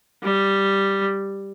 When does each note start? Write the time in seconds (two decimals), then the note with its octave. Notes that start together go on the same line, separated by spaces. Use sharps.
0.23 G3